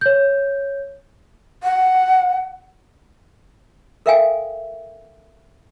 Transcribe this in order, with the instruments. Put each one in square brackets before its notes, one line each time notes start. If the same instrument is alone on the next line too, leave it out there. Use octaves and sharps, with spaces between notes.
[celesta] C#5 G6
[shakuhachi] F#5
[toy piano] A4 A#4 E5 F5 G5 G#5